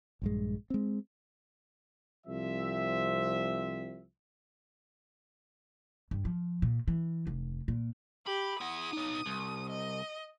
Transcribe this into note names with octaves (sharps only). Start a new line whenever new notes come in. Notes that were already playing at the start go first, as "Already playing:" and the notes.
A#1 G2 G#3
G#3 C4
C2 F3 C4 E5
G2
F3
A#2
E3
F1
A#2
G4 B5
E4 F#5 D#6
B3 D#4
C2
D#5